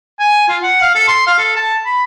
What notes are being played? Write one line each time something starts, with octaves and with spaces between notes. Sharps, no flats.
G#5
F4
F#5
F5
A4
C6
F5
A4
A5
B5